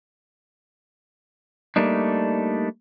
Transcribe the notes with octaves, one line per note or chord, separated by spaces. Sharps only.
G3 A3 A#3 D4 D#4